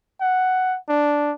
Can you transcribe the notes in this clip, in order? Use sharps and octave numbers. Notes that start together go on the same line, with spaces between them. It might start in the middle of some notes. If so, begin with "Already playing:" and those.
F#5
D4